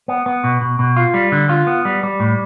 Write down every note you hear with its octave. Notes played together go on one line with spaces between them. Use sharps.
B3
B3
B2
B2
B2
F4
G3
D3
F4
B3
G3
G3
A2